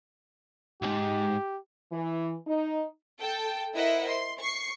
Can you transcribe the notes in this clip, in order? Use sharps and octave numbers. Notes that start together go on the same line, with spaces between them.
B1 G#2 G4
E3
D#4
A4 G5 A5
E4 A#4 C5 D#5 E5 F#5
C6
C#6 C7